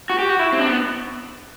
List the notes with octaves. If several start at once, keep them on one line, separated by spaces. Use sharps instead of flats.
F#4
G4
F#4
E4
C4
D4
B3